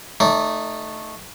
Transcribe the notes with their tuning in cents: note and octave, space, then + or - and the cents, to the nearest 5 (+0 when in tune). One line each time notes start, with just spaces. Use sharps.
A3 +0 D#4 -15 D5 -40